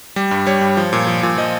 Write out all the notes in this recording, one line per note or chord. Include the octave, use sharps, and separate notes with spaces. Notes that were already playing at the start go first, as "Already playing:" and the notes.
G3
G2
G3 C#5
G2
F3
A#2
F3
A#2
F3 D#5